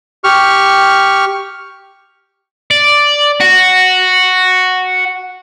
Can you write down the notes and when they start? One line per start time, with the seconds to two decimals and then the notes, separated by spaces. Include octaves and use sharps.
0.24 G4 C#6 F6
2.71 D5
3.40 F#4